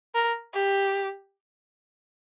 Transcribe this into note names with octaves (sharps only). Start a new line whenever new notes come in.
A#4
G4